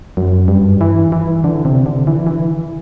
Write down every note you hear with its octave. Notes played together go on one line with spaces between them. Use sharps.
F#2
G2
E3
E3
D3
C3
D3
E3
E3